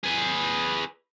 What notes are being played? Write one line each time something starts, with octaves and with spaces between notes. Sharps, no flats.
G#4 B4